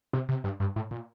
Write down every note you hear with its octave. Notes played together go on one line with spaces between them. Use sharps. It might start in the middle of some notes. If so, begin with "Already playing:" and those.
C3
C3
G2
G2
A2
A#2